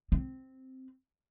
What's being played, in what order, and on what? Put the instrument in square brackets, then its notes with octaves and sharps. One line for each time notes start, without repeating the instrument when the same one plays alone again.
[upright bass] C4